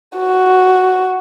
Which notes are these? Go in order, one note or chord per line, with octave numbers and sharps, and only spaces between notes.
F#4